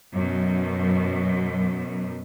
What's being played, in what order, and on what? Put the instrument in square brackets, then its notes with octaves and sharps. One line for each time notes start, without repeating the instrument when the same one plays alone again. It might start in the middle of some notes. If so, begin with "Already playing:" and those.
[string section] F#2 B2